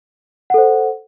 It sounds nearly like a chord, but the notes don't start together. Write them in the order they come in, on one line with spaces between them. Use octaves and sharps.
F#5 A4 C5